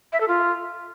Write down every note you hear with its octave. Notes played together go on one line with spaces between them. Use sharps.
E5
A4
F4